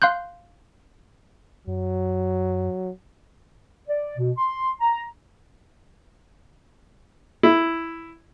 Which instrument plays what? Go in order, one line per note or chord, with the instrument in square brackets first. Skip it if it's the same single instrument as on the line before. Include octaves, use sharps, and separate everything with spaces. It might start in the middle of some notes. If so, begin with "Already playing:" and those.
[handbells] F5 C6 F#6 G6
[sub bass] F#2 [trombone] F#3
[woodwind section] D5
B2
C6
A#5
[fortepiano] E4